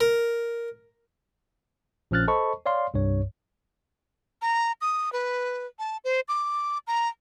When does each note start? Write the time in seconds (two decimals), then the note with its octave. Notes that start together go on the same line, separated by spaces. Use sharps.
0.01 A#4
2.11 A#1 F3 C#4 F6 F#6 A6
2.28 A4 C5 D#5 A5 B5 C#6
2.66 C#5 D5 F5 C6
2.94 C2 G2 C#5
4.42 A#5
4.81 D#6
5.12 B4
5.79 A5
6.04 C5
6.28 D6
6.87 A#5